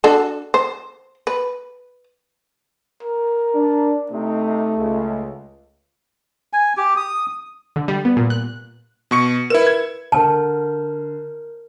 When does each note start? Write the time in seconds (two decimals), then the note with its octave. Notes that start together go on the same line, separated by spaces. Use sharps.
0.04 D4 F#4 A4
0.54 C5
1.27 B4
3.03 A#4
3.55 D4
4.11 C3 A3 C4 D#4
4.77 C#2
6.53 G#5
6.77 G4
6.97 D#6
7.76 D3
7.88 G3
8.05 B3
8.17 A#2
8.30 F#6
9.11 B2 C#6 C#7
9.50 E4 A#4 B4 E7
9.67 G#6
10.12 D3 A#4 C5 A5 F6